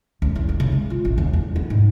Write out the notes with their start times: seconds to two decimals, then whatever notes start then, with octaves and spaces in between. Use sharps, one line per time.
0.22 C#2
0.36 E2
0.49 A#3
0.60 C#3
0.72 G#3
0.90 F4
1.05 A1
1.18 D#2
1.33 E2
1.56 B3
1.70 G#2